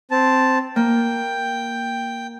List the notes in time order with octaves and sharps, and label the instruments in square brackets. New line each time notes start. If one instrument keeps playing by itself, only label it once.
[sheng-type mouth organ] C4 A5
[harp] A#3 [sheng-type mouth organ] G5